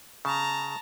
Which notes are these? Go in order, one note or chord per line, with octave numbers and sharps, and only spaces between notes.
C#3 A5 A#5